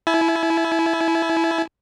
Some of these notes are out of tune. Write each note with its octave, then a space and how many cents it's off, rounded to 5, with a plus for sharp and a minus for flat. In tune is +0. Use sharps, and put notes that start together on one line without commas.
E4 +0 G#5 +45